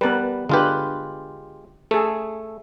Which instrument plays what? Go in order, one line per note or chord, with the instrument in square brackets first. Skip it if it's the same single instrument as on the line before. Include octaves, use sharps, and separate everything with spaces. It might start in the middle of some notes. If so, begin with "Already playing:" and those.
[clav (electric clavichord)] G3 A5 [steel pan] B3 A#4 B4
[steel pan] D3 B4 [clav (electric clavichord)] G#3 F4 G4
[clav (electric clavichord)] A3 [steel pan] G#4 A4